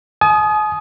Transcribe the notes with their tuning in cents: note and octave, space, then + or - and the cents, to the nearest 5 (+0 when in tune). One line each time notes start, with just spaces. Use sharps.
G#5 +45 D#6 +0